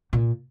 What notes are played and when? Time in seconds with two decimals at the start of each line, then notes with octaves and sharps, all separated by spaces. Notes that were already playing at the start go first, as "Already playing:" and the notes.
0.13 A#2